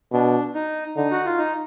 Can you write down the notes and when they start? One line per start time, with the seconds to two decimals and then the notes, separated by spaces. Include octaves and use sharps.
0.12 B2 D4
0.55 D#4
0.96 D3 D#4
1.11 F#4
1.25 F4
1.38 D#4